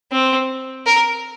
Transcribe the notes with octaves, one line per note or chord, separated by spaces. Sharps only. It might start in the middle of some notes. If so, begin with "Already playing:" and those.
C4
A#4